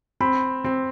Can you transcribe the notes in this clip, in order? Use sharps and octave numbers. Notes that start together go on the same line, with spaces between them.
C4 B5
C4